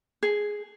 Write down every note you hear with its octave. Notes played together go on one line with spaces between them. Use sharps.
G#4